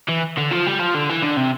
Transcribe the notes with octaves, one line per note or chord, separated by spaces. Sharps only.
E3
D3
F3
G3
F3
D3
E3
D3
C3